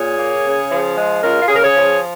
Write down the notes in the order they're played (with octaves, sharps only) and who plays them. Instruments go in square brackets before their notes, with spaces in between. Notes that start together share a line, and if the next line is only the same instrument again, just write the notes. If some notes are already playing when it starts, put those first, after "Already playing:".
Already playing: [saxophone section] A#2 G#4 C#5
A#3
C#3
F3
G#3
C#3 F4 A#4
F4
C#3 G#4
A#4
G#4 C#5
F3